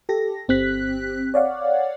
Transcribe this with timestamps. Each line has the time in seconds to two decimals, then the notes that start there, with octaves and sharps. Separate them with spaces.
0.09 G4 A4 A#6
0.48 G1 C4 G4 F#6 B6
1.34 C#5 D5 F5 F#5